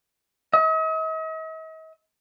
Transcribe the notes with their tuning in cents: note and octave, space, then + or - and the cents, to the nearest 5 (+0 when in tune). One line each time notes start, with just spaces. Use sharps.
D#5 +45